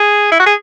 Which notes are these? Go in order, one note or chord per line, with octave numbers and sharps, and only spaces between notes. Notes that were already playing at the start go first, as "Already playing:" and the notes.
Already playing: G#4
E4
F#4
G#4